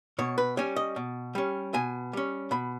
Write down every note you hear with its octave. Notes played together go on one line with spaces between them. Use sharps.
B2 C#5
B4
G3 C#4 C#5
D#5
B2
G3 C#4
B2 G#5
G3 C#4
B2 B5